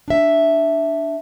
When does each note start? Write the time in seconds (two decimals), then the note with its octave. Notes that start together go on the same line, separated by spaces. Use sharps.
0.08 D4 E5